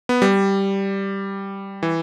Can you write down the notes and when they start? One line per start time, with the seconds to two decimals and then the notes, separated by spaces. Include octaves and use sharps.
0.09 B3
0.22 G3
1.83 E3